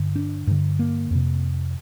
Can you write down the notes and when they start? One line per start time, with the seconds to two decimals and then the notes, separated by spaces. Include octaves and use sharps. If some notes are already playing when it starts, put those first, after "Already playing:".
Already playing: G2 D3
0.16 D4
0.47 G2 D3
0.79 A#3
1.11 F2 C3